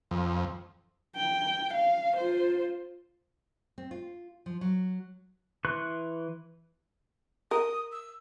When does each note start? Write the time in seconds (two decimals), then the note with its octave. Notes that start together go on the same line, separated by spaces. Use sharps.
0.11 F2
1.16 G5
1.74 F5
2.17 F4 C5
3.78 C4
3.91 F4
4.46 F3
4.61 F#3
5.65 E3 B4 C6 C#6 F#6
7.51 A#4 D#6
7.92 E6